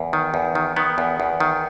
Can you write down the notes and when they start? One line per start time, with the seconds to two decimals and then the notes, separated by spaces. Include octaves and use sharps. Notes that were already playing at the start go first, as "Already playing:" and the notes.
Already playing: E2
0.13 D#3
0.34 E2
0.55 D#3
0.76 D#3 B3
0.98 E2
1.20 E2
1.40 D#3